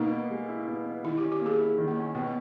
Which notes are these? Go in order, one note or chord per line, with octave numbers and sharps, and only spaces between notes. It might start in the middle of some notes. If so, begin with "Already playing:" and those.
Already playing: B2 A#3 D#4
B3
G#3
E4
B2
B3
D#3 E4
G4
C#4
G4
A#3 G#4
E4
D#3
A#3
C#4
B2 B3